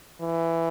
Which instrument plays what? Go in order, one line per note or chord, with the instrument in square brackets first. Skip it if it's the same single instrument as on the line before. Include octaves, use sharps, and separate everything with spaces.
[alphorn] E3